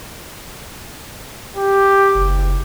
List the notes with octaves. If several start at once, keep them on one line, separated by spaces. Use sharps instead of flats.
G4
F#1